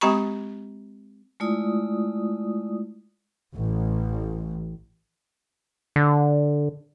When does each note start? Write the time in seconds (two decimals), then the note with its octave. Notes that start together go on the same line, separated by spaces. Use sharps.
0.01 G#3 C4 G4 A#5 B5 C#6
1.40 G#3 A3 E4 F4 D5 D#6
3.55 A1
5.96 D3